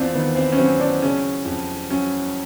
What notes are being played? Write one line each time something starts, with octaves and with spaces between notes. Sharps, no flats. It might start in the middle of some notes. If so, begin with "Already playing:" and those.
Already playing: E2 C4 D4 E4 F4
D#3 B3
C4
C#4
F#3 C4
D4
C#3 C#4
F2
F#3 C#4